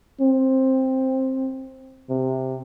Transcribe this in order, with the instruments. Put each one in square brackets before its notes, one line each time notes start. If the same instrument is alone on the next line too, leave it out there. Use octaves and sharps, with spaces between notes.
[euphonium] C4
C3